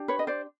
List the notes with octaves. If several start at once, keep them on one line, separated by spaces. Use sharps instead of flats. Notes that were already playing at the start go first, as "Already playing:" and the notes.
Already playing: D4 G4
B4 C#5
D#5
C5 D5